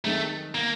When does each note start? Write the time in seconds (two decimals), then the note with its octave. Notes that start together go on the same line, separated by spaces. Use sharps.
0.05 D#3 G#3 A3 C4 D#4 G#4
0.55 A#3